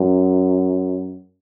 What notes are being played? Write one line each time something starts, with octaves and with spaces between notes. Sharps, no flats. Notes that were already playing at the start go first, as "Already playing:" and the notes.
Already playing: F#2